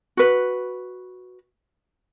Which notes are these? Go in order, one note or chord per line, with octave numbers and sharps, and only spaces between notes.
F#4 B4